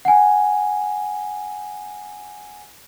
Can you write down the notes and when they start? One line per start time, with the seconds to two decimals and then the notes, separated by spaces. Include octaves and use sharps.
0.05 F#5 G#5